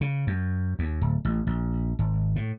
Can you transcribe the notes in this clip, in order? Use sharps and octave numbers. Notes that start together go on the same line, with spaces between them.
C#3
F#2
D#2
D1
A1
A#1
G#1
A2